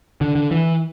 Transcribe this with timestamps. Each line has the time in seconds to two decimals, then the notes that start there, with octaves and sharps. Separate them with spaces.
0.21 D3
0.35 D3
0.51 E3